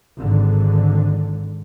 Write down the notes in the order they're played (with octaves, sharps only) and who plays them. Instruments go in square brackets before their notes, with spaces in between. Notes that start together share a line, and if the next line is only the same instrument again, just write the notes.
[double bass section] G#1 D3